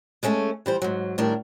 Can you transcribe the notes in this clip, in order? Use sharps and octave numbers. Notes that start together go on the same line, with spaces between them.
G#3 A3 C#4 F#4 A4
E3 G3 C5
G#2 F#3
A2 D#3 G3 D4 A#4